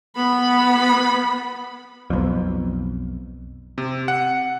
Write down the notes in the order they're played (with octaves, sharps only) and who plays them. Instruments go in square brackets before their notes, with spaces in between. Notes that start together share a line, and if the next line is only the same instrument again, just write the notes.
[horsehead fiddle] B3 B5
[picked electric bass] B1 F2
[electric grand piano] C3
F#5